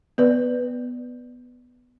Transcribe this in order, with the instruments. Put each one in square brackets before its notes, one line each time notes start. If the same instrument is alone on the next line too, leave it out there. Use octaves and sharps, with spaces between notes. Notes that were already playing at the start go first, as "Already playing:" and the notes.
[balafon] B3 B4 D5